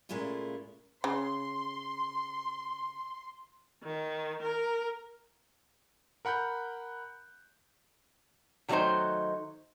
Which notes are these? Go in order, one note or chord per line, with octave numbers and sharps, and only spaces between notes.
A#2 C#3 G#3 A3 E4 F4
C#3 C6
D#3
A#4
A#4 F#5 B5 F#6 G6
D#3 F#3 G3 A3 D#4 C5